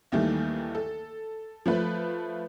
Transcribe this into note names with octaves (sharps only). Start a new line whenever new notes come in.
D#2 D#3 E3 G3 A3
A4
F3 A3 B4